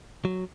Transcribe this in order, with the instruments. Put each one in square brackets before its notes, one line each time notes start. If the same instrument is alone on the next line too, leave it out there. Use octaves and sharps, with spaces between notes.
[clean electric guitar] F#3